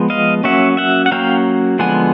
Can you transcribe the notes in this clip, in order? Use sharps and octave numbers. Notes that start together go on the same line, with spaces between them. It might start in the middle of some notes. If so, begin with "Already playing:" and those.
Already playing: F3 G#3 B3
D#5 F5
F#3 A#3 C#4 E5 F#5
E5 F#5
F#5
F#3 A#3 C#4 F5 G5
D3 F3 G#3 B3 F#5 G#5